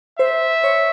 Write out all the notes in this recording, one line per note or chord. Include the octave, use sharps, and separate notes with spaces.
C5 E5
C#5